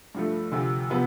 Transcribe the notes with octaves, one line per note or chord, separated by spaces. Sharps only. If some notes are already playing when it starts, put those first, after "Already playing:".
G2 F3 A3
D2 C3 F3
C3 F3 B3